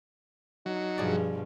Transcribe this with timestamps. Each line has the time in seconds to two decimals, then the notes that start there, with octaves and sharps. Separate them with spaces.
0.66 F#3 D#4
0.98 G2 B2 F3 G#4 D5